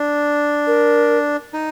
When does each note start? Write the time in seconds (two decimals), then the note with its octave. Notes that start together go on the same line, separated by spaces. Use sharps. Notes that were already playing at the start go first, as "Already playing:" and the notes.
Already playing: D4
0.67 A#4
1.53 D#4